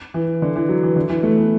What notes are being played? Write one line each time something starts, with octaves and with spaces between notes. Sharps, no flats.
E3
D3
E3
F#3
E3
D3
E3
A3
B3